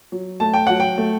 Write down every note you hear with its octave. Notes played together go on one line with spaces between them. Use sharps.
F#3
A3 A5
G5
F#3 F#5
G5
A3